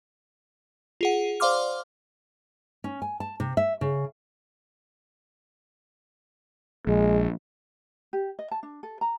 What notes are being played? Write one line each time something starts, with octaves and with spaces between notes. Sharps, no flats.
F4 G#4 F#5
C5 D5 F5 C6 D6 F6
C#4
G#5
A5
C3
E5
C#3
A#1 G#3
G4
D#5
A5
D4
A4
A#5